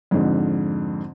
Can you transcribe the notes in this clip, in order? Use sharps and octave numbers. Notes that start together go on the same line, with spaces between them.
F2 G#2 D3